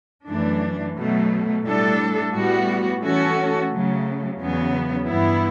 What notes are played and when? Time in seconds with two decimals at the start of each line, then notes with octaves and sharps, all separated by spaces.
0.28 F#2 E3 A3 D4
0.96 B2 F#3 A3
1.64 A2 G3 D4 A4
2.33 A2 G3 B3 F#4
3.02 E3 A3 C#4 F#4 A4
3.69 C#3 F#3 A3
4.39 E2 C#3 F#3 B3
5.06 G2 E3 B3 E4